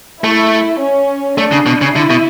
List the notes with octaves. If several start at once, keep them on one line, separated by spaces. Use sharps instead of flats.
A3 E4
C#4
A3 D4
C#3
B2
C#3
D3 E4
B2